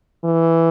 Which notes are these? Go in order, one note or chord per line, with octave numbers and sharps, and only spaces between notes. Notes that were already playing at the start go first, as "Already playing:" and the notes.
E3